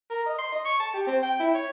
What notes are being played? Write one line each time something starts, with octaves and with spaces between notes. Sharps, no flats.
A#4
D#5
C6
D#5
C#6
A5
G4
C4
G5
E4
C#5